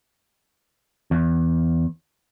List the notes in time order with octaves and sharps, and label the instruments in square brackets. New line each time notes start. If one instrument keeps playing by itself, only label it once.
[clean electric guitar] E2